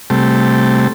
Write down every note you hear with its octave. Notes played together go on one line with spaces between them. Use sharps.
C3 G3 A3